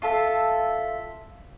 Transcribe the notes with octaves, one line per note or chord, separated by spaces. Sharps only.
F4 A4 E5